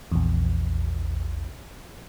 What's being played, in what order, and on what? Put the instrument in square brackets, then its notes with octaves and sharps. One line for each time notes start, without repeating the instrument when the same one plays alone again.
[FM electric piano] A#1 E2